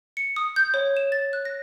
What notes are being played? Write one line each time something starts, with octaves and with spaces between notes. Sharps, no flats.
C#7
D#6
G6
C#5
E7
A6
F#6
A#6